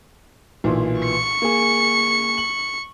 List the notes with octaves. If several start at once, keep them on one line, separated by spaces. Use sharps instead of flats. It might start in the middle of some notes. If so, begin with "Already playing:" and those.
B1 A#2 E3
C#6 C#7
A#3 G#4
F#7